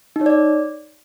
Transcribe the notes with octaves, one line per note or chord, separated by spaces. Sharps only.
D#4
C#5
D5